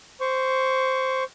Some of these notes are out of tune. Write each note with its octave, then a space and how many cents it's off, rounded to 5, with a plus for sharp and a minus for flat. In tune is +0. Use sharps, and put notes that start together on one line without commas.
C5 +0 C#6 +15